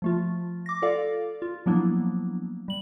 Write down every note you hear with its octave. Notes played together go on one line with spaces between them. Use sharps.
F3 A3 F4
D6 A#6
F4 A4 D5 F5
F4
F3 F#3 A#3 B3 D4 E4
G3 F#7